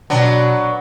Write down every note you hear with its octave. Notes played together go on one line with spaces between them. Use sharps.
B2 F#3 B3 D4